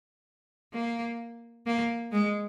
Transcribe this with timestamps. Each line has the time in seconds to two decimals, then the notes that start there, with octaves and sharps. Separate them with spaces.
0.73 A#3
1.67 A#3
2.12 G#3